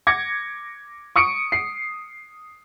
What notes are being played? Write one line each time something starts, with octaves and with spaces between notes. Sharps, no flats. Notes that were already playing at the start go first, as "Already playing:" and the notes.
D6 G#6 A#6 C#7
C#6 D#6 C#7 D7
C7